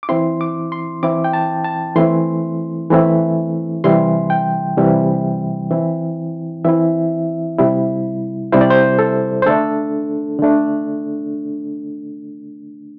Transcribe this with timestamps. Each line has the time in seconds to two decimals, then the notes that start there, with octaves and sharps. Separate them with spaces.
0.03 D6
0.09 E3 C4 E4 C6
0.41 D6
0.72 C6
1.03 E3 C4 E4 D6
1.24 G5
1.33 A5
1.65 A5
1.96 E3 A3 C4 E4 C6
2.90 E3 A3 C4 E4
3.84 C3 E3 G3 E4 C6
4.30 G5
4.77 C3 E3 G3 E4
5.71 E3 C4 E4
6.65 E3 C4 E4 E5
7.58 C3 G3 E4
8.52 C3 G3 E4 C5
8.61 D5
8.70 C5
8.99 A4
9.42 C5
9.46 D3 A3 D4 A4
10.39 D3 A3 D4